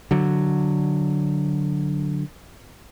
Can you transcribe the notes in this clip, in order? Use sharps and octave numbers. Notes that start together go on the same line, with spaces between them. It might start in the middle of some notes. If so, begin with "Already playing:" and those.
D3 F#3